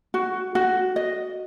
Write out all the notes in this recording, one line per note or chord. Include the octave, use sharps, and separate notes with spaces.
F#4
F#4
D#5